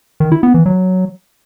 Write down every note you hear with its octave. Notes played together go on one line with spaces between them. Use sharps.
D#3
E4
B3
E3
F#3